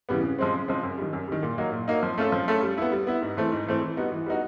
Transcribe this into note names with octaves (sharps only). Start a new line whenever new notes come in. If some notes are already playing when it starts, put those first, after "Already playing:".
C#3 E3 G3 B3
C#3
F3 G#3 C4
C#3
F3 G#3 C4
F#2
D#3 G3
F#2
D#3 G3
A#2
F#3 A#3 D#4
A#2
F#3 A#3 D#4
F3
A3 C#4 F4 A4
F3
A3 C#4 F4 A4
G3
B3 E4
G3
B3 E4
G#2
E3 A3 C4
G#2
E3 A3 C4
E3
G3 B3 D#4 F#4
E3
G3 B3 D#4 F#4